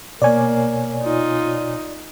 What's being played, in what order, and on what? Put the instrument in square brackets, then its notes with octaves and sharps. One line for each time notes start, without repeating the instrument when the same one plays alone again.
[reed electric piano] B2 C#5 G#5 [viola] A#3 [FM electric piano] D5
[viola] D#4 F4